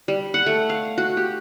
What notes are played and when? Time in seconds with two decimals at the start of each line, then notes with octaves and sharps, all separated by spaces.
0.08 G3
0.34 F#5
0.46 A3
0.69 F5
0.98 F#4
1.17 G4